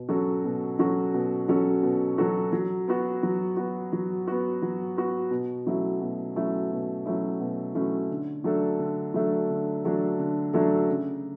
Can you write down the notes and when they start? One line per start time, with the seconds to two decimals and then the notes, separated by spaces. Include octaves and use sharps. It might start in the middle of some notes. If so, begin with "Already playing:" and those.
Already playing: B2
0.09 F#3 C#4 F#4 A4
0.44 B2
0.79 F#3 C#4 F#4 A4
1.14 B2
1.48 F#3 C#4 F#4 A4
1.83 B2
2.18 F#3 C#4 F#4 A4
2.52 F#3
2.88 B3 F#4
3.23 F#3
3.57 B3 F#4
3.93 F#3
4.27 B3 F#4
4.62 F#3
4.96 B3 F#4
5.31 B2
5.67 F#3 A3 C#4 E4
6.01 B2
6.36 F#3 A3 C#4 E4
6.71 B2
7.05 F#3 A3 C#4 E4
7.40 B2
7.75 F#3 A3 C#4 E4
8.10 D3
8.44 F#3 A3 D4 A4
8.79 D3
9.14 F#3 A3 D4 A4
9.50 D3
9.85 F#3 A3 D4 A4
10.19 D3
10.53 F#3 A3 D4 A4
10.88 C#3